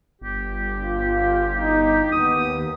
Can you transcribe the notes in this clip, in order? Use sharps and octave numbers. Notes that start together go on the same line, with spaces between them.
G1 G4
F4
D#4
D#2 B3 D#6